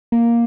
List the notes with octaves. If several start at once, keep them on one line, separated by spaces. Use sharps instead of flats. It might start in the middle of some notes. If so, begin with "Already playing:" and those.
A#3